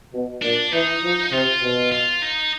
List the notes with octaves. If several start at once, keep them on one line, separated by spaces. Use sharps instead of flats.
B2
A#2 D4
E3 D#4
F3
C3 F4
B2
F4
D#4